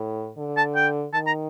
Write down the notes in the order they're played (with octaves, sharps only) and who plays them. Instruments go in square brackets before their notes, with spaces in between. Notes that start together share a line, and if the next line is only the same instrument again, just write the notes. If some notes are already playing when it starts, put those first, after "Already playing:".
Already playing: [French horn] A2
D3
[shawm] A5
G5
[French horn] D#3 [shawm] A5
[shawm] A#5